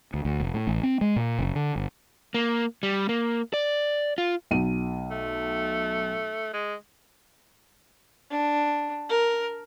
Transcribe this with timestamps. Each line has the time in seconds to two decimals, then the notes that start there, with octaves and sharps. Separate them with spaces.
0.14 D2
0.25 D2
0.40 F1
0.54 A2
0.67 A1
0.83 C4
1.01 G#3
1.16 A#2
1.39 F#1
1.55 D3
1.76 G1
2.34 A#3
2.83 G3
3.09 A#3
3.54 D5
4.18 F4
4.51 B1 D#7
5.11 A3
6.53 G#3
8.30 D4
9.09 A#4